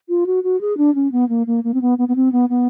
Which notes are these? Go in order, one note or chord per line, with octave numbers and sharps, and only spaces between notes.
F4
F#4
F#4
G#4
D4
C#4
B3
A#3
A#3
A#3
C4
B3
B3
B3
C4
B3
B3